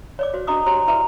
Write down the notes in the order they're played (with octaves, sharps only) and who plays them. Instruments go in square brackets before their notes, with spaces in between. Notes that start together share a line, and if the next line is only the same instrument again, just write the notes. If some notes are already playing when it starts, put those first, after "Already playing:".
[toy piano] C#5 D5 D6
F#4 C5
D4 F#4 D#5 A#5 D6 D#6
F#4 G4 C5 C#5 A#5 C6
E4 B4 D5 E5 A#5